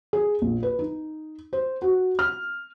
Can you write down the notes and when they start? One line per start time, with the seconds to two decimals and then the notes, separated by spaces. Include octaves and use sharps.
0.13 G#4
0.42 A#1
0.63 B4
0.79 D#4
1.53 C5
1.82 F#4
2.19 F6